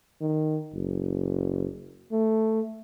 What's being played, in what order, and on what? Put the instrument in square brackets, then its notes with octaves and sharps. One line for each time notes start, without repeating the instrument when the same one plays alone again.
[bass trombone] D#3
F#1
A3